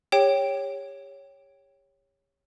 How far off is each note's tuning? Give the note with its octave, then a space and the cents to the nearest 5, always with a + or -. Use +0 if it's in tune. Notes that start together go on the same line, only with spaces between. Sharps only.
G4 +35 C#5 +0 G5 +0